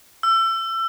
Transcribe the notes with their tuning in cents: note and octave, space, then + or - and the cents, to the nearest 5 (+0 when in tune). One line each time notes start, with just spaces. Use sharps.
E6 +30